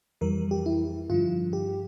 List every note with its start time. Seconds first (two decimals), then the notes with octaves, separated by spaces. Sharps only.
0.21 F2 E3 G3 A#4
0.51 G4
0.66 E4
1.10 G2 D3 F3 F4
1.53 G4